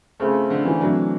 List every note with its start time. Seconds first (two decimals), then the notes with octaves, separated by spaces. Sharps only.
0.20 C#3 A3 C4 F4 A4
0.50 D3
0.65 E3
0.80 C3 E3 F#3 A3 D4